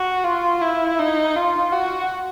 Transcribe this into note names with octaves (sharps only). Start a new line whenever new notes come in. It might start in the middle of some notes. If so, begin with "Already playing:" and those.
Already playing: F#4
F4
E4
D#4
F4
F#4